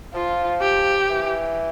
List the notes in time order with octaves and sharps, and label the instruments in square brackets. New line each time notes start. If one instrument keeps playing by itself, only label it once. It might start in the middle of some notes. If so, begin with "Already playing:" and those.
[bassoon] F3 [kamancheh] F4
[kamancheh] G4
[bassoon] E3